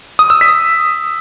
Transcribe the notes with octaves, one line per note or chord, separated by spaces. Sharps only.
D#6
E6
B6